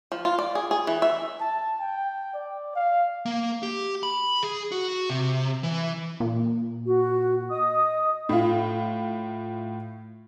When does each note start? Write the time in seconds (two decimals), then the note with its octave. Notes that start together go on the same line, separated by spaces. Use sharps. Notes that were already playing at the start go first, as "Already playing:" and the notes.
0.12 F3
0.25 F4
0.39 D5
0.55 G#4
0.71 G#4
0.87 E3
1.02 E5
1.41 A5
1.80 G5
2.34 D5
2.76 F5
3.26 A#3
3.63 G4
4.03 B5
4.43 G#4
4.72 F#4
5.10 C3
5.63 E3
6.20 A#2
6.85 F#4
7.50 D#5 D#6
8.29 A2 F4